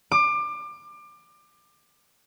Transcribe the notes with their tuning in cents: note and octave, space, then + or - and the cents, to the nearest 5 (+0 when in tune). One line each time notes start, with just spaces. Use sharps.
D6 +25